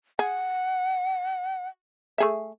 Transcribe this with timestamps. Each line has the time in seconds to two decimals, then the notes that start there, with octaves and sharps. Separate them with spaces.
0.19 G#4 F#5
2.18 A3 G#4 E5